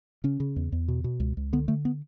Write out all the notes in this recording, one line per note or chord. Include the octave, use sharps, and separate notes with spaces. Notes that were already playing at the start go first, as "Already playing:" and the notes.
C#3 C#4
C#3
E2
E2
B2
B2
C#2
C#2
D3 B3
D3 A3
B3